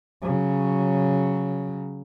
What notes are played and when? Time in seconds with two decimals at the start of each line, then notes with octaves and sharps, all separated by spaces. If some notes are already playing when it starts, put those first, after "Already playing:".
0.22 C#3 F#3